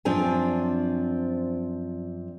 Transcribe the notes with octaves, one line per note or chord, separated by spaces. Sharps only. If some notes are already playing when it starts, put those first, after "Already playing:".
F#2 F3 C4 D4 G#5